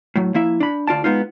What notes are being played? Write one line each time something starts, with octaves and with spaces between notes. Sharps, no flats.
A2 F#3
F3 A#3 E4 E5
D4 B5
D2 F4 D5 A5
G#3 B3 D#4 F4